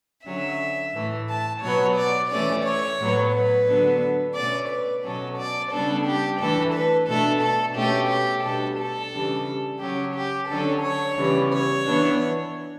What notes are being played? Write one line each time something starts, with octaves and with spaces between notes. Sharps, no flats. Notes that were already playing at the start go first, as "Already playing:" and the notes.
D3 F#3 C#4 E5
A2 E3 A3
A5
B2 F#3 B3 C#5
D5
E3 A3 C#4 D5
C#5
A2 F#3 B3
B4
D3 F#3 B3 D4
B2 A3 C#4 D5
B4
B2 F#3 C#4 A4
D5
C#3 G3 B3 D4 A4
G4
E3 A3 D4 A4
B4
B2 A3 D4 A4
A4
B2 A3 C#4 G4
G4
B2 G3 D4 A4
A4
C#3 E3 G3 D4
C#3 F#3 C#4 G4
G4
D3 F#3 C#4 A4
C#5
C#3 E3 G3 B3
C#5
E3 B3 D4